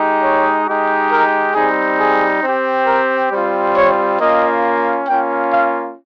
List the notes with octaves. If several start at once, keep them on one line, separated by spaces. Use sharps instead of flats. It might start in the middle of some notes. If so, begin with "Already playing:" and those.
Already playing: G#3 D#4 G4
C#5
G#3 D#4 G4
A#4
G3 C4 D#4 G#4
G#4
C4 G4
A#4
G3 C4 F4 C5
C#5
A#3 C#4 F4 D#5
A#3 C#4 F4 G5
F5